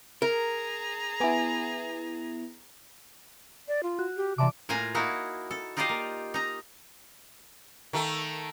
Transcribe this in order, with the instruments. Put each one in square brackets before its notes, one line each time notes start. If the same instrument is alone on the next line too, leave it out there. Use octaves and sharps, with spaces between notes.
[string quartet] G#4 A#5 [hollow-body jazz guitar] A#4
[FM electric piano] B3 E4 [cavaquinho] G#5 D6
[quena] D5
F4
[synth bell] F#4
[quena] G4
[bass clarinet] C3 [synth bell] E3 D5 D6 [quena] A5
[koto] A2 A#3 F4 G#5 A#5
A#3 D#4 E4 F#4
A4
D#4 F4 G4 D5 D#5 F5
A#3
D#4 A#5
[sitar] D#3 A3